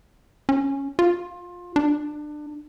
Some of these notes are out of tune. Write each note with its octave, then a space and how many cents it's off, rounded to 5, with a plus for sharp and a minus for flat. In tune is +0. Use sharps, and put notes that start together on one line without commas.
C#4 -5
F4 +20
D4 +25